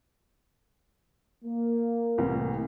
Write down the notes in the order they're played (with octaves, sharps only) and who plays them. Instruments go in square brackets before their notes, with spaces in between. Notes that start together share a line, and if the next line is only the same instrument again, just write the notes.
[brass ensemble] A#3
[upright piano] C2 A2 E3